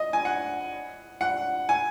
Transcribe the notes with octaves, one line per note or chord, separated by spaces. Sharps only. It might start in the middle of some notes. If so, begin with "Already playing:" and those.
Already playing: D#5
G#5
F#5
F#5
G#5